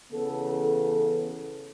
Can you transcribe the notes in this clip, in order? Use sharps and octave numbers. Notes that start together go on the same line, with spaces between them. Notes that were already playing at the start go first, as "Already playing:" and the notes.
C#3 E3 B3 A4
A4